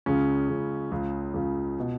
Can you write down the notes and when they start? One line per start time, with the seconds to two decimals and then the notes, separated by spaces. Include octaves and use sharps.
0.06 C#2 C#3 C#4
0.49 C#2 C#3
0.91 C#2 C#3
1.34 C#2 C#3
1.80 B2